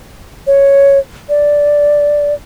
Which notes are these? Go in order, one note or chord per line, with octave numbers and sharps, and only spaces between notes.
C#5
D5